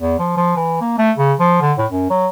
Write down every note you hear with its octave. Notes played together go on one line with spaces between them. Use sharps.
E2
F3
F3
E3
A#3
A3
C#3
F3
D3
A2
F#2
F#3